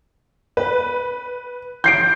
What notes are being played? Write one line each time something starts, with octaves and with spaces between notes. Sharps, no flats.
B4
G6 C7 D7